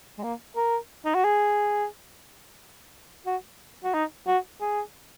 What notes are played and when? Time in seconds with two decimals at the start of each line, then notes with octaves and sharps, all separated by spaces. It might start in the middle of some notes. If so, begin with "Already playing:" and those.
0.18 G#3
0.23 A#3
0.57 A#4
1.05 D#4
1.15 F#4
1.25 G#4
3.26 F#4
3.84 F#4
3.94 D#4
4.27 F#4
4.61 G#4